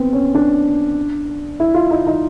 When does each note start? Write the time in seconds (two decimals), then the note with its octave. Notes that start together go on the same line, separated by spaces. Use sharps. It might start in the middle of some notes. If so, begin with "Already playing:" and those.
Already playing: B3 C4
0.13 C#4
0.35 D4
1.60 E4
1.74 F4
1.91 D#4
2.07 D#4